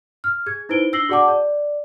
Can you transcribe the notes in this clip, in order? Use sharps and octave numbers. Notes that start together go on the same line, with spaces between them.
F6
G#4 G#6
D#4 E4 B4 C5 D7 G7
D4 E6 A#6 C7 F#7 G7
F#4 G#4 D5 F#5 A5 D6
D5